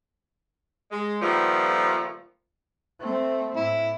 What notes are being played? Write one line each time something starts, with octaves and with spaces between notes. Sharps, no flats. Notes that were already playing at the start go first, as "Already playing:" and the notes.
G#3
A#2 D#3 F3 G3 A3 B3
A3 C4
A2 E4